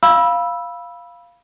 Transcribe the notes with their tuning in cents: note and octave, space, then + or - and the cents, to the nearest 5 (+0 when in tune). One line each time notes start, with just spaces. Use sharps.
F5 +0 B5 -15 E6 +0